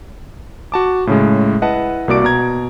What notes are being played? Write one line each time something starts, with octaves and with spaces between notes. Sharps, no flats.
F#4 A5 D6
A2 C#3 G#3
E4 B4 D#5 F#5 A5
C2 A#3 F#4 D5 D6 D7
B2 A#5 G#6